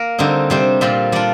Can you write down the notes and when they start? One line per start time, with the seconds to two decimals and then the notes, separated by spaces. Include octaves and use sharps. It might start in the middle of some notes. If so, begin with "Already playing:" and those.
Already playing: A#3 A#4
0.18 D3 G3 C4 D#4
0.50 C3 G3 C4 C5
0.81 A#2 G3 C4 F4
1.12 G3 D4 F4 D5